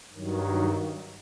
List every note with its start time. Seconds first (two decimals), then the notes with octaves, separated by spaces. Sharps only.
0.12 G2 D#3 F#3